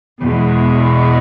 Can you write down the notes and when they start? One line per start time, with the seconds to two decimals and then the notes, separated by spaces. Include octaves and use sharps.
0.20 E2 B2 G#3